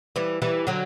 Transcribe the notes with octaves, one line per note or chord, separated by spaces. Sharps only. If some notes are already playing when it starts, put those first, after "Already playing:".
E3 G3
E3 G3
D3 F#3